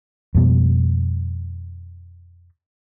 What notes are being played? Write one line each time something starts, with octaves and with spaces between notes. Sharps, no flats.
F2 B2 G3